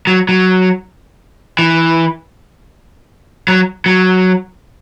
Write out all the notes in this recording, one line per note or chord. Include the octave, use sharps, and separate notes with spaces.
F#3
F#3
E3
F#3
F#3